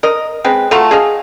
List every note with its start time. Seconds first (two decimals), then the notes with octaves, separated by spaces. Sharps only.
0.03 A#4 D#5
0.44 G#3 C4 B4
0.71 A3 F4 F#4 A#5
0.91 G#4 D#5 F5